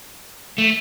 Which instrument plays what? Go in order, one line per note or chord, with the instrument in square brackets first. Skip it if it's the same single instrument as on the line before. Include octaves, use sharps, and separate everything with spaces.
[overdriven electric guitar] A3